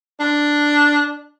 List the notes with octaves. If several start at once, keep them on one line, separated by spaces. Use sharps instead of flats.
D4